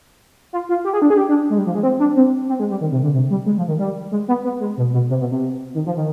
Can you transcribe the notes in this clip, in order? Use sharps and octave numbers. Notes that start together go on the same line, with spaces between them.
F4
F4
G4
G#4
D4
G#4
G4
D4
G#3
G3
F3
G#3
C4
D4
C4
C4
G#3
G3
D#3
C3
D3
C3
G3
G#3
F3
D#3
G3
G#3
B3
B3
G#3
B2
B2
C3
B2
C3
D#3
F3
D#3